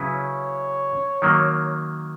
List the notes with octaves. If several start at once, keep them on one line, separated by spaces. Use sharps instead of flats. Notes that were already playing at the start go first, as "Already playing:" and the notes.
Already playing: C#3 F#3 C#4 E4 B4
C#5
D#3 F#3 A#3